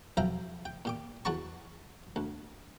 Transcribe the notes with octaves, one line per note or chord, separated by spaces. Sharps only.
B1 F3 E5 F5 G5 A#5
G5
A#2 G4 D6
E2 F#4 F#5 A5 A#5 C#6
D2